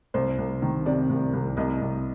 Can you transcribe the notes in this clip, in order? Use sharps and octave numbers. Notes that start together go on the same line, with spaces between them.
C2 C5
C2
D#3
C3 D5
C2
C2
C2 D#5
C2